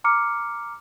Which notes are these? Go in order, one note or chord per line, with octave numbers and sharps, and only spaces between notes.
A#5 D6 F6 C#7